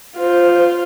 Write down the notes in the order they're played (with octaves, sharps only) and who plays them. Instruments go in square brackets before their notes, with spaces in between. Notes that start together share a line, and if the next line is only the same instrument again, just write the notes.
[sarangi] F4 [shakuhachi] C5